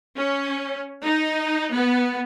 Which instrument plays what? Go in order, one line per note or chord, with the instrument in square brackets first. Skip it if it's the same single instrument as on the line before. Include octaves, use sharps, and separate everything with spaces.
[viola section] C#4
D#4
B3